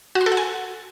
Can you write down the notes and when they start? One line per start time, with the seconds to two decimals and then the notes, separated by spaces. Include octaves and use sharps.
0.15 F#4
0.21 C6
0.26 A4
0.32 F#5
0.37 G#5